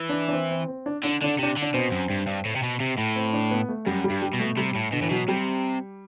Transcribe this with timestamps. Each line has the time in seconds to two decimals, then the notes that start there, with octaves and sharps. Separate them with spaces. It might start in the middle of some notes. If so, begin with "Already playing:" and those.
Already playing: E3
0.09 D4
0.28 D4
0.33 C4
0.51 C4
0.68 C4
0.86 D4
1.03 D3 D4
1.22 D3 D4
1.39 C3 D4
1.57 D3
1.62 D4
1.74 B2 C4
1.91 F#2
2.10 G2
2.27 G2
2.45 A2
2.56 C3
2.63 B2
2.80 C3
2.98 A2
3.16 C4
3.33 D4
3.51 B3
3.69 A3
3.86 F#2 G3
4.04 G3
4.10 G2
4.22 G3
4.33 B2
4.40 A3
4.57 C3 G3
4.75 A2
4.92 B2 D3
5.02 A2 E3
5.10 B2 F#3
5.28 C3 G3